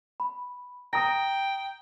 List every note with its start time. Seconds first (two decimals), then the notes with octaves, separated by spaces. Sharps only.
0.20 B5
0.93 G5 A#5 D#6 A#6